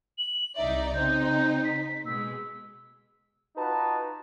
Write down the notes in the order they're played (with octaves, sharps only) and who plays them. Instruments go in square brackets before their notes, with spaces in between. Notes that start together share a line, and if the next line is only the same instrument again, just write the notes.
[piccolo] F#7
[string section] C2 D#4 D5 [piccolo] E5
[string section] C#3 C4 D#4 [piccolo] G6
[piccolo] B6
[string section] B2 G#3 [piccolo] E6
[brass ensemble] D#4 F4 F#4 B4 A5